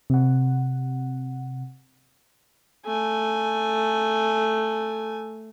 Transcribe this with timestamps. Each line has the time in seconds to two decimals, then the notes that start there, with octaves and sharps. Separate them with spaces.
0.10 C3 F#5
2.86 A3 G#5